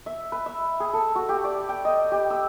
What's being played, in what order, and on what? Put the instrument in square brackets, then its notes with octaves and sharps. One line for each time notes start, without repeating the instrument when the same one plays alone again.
[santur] E5
B4
E5
G#4
A4
F#4
G4
D5
G5
D#5
G4
E6